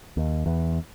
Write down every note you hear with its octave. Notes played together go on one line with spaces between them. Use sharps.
D#2
E2